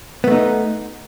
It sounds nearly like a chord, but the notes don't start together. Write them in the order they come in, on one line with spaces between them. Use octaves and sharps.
B3 A3 D#4